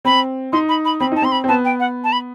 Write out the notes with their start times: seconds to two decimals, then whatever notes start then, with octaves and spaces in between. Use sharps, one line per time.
0.05 C4 B5
0.53 D#4 C6
0.69 B5
0.85 B5
1.00 C4 B5
1.12 D#4 A5
1.22 C4 C6
1.32 B5
1.44 C4
1.48 B3 A5
1.65 G5
1.80 F#5
2.04 A5
2.12 B5